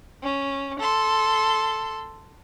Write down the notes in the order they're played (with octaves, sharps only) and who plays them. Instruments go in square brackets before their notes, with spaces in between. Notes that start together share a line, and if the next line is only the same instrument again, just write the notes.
[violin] C#4
A4 C6